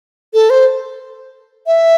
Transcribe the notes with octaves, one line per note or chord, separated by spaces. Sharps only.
A4
C5
E5